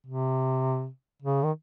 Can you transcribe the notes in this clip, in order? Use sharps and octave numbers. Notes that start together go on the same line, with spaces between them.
C3
C#3
D#3